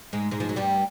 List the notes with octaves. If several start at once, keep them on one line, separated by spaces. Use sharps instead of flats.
G#2 G#3
G#2 G#3
F3
F#3
G2 G3